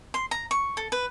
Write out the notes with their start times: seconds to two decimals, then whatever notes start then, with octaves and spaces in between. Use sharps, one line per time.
0.14 C6
0.31 A#5
0.51 C#6
0.77 A4
0.92 B4